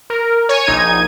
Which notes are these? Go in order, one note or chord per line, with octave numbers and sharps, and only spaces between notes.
A#4
C#5 G#5
A#1 D#4 G#6 D#7